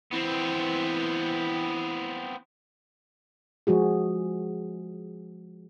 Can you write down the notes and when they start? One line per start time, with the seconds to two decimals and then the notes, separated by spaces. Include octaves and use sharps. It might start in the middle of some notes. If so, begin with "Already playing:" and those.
0.12 E3 B3 C4
3.67 F3 G#3 F#4 G#4